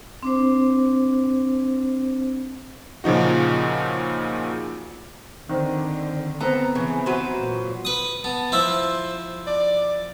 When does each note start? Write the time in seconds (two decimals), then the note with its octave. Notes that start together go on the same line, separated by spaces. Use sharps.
0.23 C4 D4 C5
3.04 A#2 C#3 F3 D#4 F#4
5.49 D3 D#3 C4
6.40 B3 C4 A4 A#5
6.75 C#3 E3
7.06 F#3 B4 C5
7.37 A#2
7.85 B4 D#6
8.24 B3 A5
8.52 F3 E4 C5 E5
9.47 D5